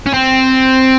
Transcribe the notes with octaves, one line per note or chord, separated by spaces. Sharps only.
C#4
C4